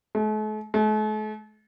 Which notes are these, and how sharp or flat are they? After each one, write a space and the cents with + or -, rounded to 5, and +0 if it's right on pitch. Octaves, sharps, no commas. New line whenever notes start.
A3 -45
A3 -45